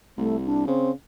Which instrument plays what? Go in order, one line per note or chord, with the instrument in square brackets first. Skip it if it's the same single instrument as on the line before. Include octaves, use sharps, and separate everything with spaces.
[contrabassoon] C2 [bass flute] A3
[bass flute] D4
[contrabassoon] C#3 [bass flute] C4